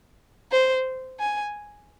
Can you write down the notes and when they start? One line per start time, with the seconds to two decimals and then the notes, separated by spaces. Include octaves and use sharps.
0.52 C5
1.19 G#5